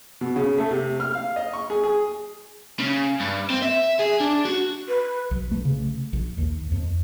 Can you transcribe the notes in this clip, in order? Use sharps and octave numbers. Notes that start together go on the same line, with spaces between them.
B2
C#3
A3
C3
F6
F5
D#5
C#6
G#4
G#4
C#3
G2
C4
E5
G#4
D4
F#4
B4
B1
A3
C#3
A#1
D#2
F2